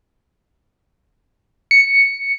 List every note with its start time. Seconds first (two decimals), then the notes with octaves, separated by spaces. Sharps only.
1.71 C#7